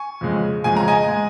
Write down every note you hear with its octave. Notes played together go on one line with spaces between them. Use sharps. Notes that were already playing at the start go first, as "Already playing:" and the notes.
Already playing: G#5 C#6
F2 C#3 G#3
F2 C#3 G#3 G#5
A#5
D#5 G#5
G#3